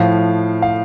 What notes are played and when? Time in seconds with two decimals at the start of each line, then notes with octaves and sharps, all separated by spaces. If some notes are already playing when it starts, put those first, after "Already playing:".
Already playing: A2 F3 F5
0.62 F5